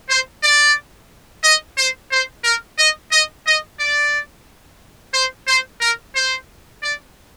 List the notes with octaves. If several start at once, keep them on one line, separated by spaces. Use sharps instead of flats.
C5
D5
D#5
C5
C5
A#4
D#5
D#5
D#5
D5
C5
C5
A#4
C5
D5